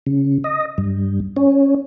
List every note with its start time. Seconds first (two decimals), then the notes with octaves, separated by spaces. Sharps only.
0.06 C#3
0.44 D#5
0.78 G2
1.36 C#4